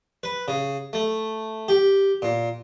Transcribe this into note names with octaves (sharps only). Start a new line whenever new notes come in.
B4
C#3
A3
G4
A#2